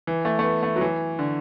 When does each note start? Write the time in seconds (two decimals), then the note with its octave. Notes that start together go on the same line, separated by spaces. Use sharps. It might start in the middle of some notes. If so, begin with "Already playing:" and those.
0.07 E3
0.25 A3
0.39 A3
0.44 B3
0.63 A3
0.76 F#3
0.81 E3
1.19 D3